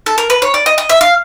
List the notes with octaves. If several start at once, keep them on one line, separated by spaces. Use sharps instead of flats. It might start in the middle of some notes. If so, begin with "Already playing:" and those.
A4
A#4
B4
C#5
D5
D#5
D#5
E5
F5